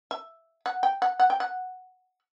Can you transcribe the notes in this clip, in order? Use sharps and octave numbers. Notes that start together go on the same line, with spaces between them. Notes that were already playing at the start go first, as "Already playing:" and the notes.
E5
F#5
G5
F#5
F#5
G5
F#5